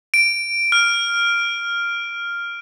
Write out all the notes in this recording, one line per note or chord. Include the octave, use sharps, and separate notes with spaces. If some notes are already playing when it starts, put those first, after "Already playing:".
D7
F6